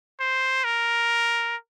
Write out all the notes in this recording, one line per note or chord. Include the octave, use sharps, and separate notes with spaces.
C5
A#4